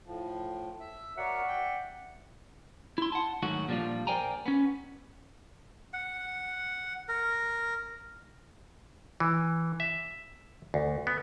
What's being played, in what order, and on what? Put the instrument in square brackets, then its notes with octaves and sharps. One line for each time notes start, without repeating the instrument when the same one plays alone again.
[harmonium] A2 F3
E5
[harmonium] F#4 A#4 C#5 [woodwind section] D5 E5 F#5
[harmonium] G5
[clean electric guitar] E4 C6
F#5 A5
G#2 D#3 F#3 A3 F#4
A#2 F3 G3 D4 F4
A#4 C5 D5 G5 G#5 A#5
B3 C#4
[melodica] F#5
A#4
[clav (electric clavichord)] E3
E5
D2
B3